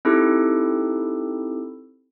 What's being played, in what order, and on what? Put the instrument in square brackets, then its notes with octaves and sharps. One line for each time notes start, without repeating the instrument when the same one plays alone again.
[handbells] C4 D#4 E4 G4 A4